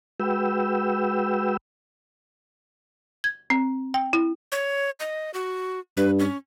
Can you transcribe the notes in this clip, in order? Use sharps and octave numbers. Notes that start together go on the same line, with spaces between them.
G#3 F#4 B4 G5 E6
G#6
C4
G5
E4
C#5
D#5
F#4
G2 B4
C#4